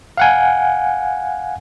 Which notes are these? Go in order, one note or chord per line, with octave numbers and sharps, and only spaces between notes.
F5 F#5 G#5